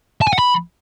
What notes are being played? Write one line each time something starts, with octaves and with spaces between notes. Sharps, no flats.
A5
G#5
F#5
B5